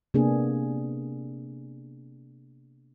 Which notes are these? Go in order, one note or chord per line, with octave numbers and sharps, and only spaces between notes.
C3 A#3 B3 D4 G#4